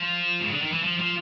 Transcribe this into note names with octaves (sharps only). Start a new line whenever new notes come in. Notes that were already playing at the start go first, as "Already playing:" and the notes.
Already playing: F3
C#3
D3
D#3
E3
F3
F3